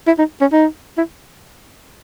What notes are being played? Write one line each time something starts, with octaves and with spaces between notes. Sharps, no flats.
E4
D#4
C#4
D#4
E4